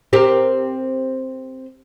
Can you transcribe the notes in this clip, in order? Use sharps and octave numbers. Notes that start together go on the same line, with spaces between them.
C4 G4 A#4